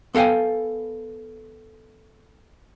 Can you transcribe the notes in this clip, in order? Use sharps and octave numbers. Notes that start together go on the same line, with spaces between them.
B3 A4 F5 G5 G#5